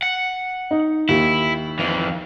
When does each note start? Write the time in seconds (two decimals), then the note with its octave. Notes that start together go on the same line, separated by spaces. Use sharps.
0.02 F#5
0.71 D#4
1.09 D#2 E4
1.79 F2 E3